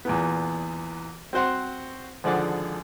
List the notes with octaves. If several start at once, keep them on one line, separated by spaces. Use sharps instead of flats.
E2 A#2 B3
C4 F#4 C5 F#5 C6
G#1 D3 F3 G#4 D5 F#5